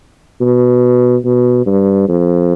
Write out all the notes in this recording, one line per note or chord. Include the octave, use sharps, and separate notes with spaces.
B2
B2
G2
F2